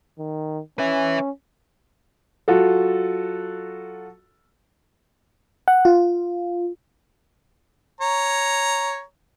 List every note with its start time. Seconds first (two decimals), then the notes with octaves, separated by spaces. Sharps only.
0.19 D#3
0.79 C#4 B4 E5
2.48 F#3 F4 F#4 A4
5.68 F#5
5.85 F4
8.01 C#5 A#5